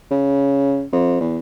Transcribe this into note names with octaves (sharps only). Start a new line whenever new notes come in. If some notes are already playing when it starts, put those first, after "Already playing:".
C#3
F2
E2